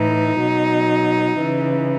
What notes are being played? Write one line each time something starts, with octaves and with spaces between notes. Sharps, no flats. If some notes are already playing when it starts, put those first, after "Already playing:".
Already playing: A2 E3 D#4
B2 F#3
C#3 E3